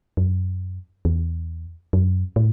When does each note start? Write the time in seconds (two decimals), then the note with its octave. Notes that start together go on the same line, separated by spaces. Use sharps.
0.17 F#2
1.05 E2
1.93 F#2
2.36 A2